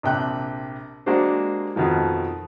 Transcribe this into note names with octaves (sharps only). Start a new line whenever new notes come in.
A#1 C3 G5 F#6
G#3 A#3 D4 F#4 G4 C5
F2 B2 D#3 F3